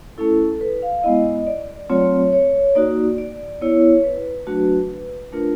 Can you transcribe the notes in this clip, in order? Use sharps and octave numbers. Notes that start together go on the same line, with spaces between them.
A3 C#4 E4 A4
B4
F5
G#3 B3 E4 D#5
D5
F#3 A3 C4 F4 C#5
C#5
A#3 D#4 F#4 D5
D5
B3 E4 C#5
B4
F#3 A3 D4 F#4
A3 D4 F4 A#4